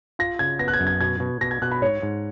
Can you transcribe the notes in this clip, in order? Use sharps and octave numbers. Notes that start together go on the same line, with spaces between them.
F4 A#6
C#3 G#6
B3 A#6
F#6
G#6
F#2
G#6
B2 G#6
B2
B2 A#6
G#6
B2 F#6
B5
G#2 C#5
G#2